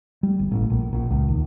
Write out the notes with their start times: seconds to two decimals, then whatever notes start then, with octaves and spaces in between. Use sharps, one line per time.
0.23 G3
0.39 G1
0.51 A1
0.70 A#1
0.92 A#1
1.10 C#2
1.28 D#2